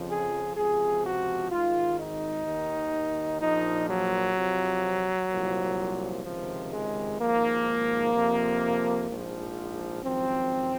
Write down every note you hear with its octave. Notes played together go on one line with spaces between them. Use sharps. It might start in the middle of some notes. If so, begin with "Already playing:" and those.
Already playing: F2 C#3 F3
G#4
C#2 C3 F3 G#4
F#4
G#1 G#2 D#3 F4
D#4
D#2 D#3
A#1 A#2 F3 D#4
F#3
F2 C3 F3
C2 A#2 F3
C#2 C3 D#3 F3
G#3
G#1 G#2 F3 A#3
F2 C3 F3
A#1 G#2 F3
G#1 F#2 F3 C4